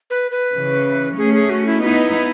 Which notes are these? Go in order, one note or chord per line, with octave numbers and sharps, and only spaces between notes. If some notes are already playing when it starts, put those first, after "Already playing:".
B4
B4
C#3 E3
A3 C#4 G#4
G#4
F#4
E4
B3 D#4 E4 F#4